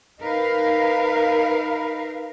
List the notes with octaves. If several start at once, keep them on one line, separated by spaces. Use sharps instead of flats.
D#4 A#4 B4 F5